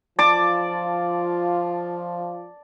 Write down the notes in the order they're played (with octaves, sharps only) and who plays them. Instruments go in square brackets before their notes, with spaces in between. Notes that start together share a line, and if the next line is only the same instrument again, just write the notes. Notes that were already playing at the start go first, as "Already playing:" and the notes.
[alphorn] F3 [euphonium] F4 [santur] D5 [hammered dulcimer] A5 D6